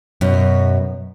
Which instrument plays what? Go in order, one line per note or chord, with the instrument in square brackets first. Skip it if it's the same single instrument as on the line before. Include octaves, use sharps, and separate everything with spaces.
[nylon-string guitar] F#2 B2